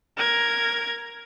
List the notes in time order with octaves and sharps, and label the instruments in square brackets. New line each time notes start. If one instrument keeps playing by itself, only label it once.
[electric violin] A#4 G#6